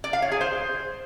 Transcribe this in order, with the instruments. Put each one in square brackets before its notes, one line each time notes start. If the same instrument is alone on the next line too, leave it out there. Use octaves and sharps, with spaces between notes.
[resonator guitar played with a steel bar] D5
F5
C#5
G#4
C5